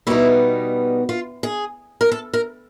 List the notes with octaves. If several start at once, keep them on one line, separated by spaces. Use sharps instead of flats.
B2 G3 B3 D#4 E4
F4
G#4
A#4
A4
A#4